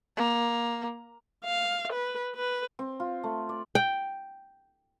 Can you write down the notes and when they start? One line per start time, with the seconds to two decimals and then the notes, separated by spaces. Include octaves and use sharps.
0.17 A#3
1.44 F5
1.92 B4
2.35 B4
2.79 C4
3.00 F4
3.24 A3
3.49 D5
3.75 G5